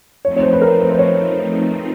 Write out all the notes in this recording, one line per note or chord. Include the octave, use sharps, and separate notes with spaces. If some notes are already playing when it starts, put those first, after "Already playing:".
F3 A3 C4 D#4 C#5
C#5
C5
B4
A#4
C5
C5
C#5